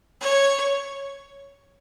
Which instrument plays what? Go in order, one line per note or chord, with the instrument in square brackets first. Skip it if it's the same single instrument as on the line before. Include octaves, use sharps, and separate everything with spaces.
[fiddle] C#5